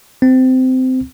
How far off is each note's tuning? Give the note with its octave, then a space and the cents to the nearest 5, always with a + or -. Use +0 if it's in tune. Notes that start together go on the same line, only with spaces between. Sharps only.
C4 -20